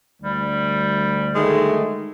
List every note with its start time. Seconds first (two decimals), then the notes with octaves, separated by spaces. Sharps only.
0.22 D2 G3
1.35 D#3 G#3 A3